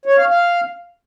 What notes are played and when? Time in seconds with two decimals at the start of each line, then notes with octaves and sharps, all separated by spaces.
0.05 C#5
0.17 F5
0.29 F5